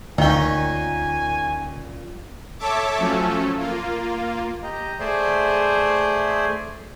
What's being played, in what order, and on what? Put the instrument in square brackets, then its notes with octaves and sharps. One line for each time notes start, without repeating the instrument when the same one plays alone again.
[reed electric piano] D2 [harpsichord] A#2 C#4 [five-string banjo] D#3 G5 [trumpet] G#5
[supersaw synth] A4 C#5 E5 A5 D6
F3 F#3 A3 C#4 A4
A#3 F4
[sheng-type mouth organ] G4 D#5 A#5
A3 G#4 C5 D5 E5 C6